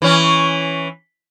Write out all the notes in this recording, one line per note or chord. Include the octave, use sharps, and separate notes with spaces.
E3 C#4